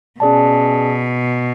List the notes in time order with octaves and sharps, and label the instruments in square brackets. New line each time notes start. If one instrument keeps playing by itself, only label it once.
[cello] B2 [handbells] C#4 G#4 D5 A5